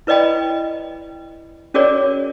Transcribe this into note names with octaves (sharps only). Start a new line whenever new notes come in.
E4 B4 D5 D#5 G5 B5
C#4 F#4 G#4 A#4 C#5 D5